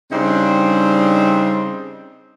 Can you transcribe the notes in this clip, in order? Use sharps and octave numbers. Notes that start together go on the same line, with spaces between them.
C#3 G3 C4 D4 D#4 C5